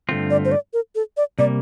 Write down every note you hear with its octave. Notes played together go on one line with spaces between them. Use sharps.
G2 D3 A3 C4 F4
D5
C5
D5
A#4
A4
D5
C3 G3 A#3 D5